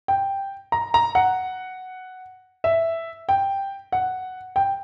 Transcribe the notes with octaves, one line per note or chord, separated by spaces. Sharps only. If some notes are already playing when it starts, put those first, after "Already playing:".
G5
A#5
A#5
F#5
E5
G5
F#5
G5